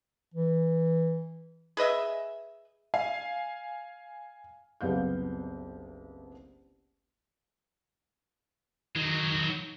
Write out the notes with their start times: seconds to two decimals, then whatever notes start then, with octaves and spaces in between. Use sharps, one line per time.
0.34 E3
1.77 G#4 B4 D#5 E5
2.94 F5 G#5
4.81 F#1 C2 B3 F5 G6
8.96 D#3 F#3 G#3